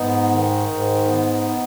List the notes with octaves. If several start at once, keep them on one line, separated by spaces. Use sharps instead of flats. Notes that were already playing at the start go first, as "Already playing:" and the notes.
Already playing: G#2 B3 D#4
D#3
G#2
B3